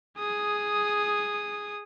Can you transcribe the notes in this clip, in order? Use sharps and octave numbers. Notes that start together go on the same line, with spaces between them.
G#4 D#6